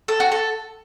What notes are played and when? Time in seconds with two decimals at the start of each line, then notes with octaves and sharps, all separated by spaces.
0.08 A4
0.20 F#4
0.32 A4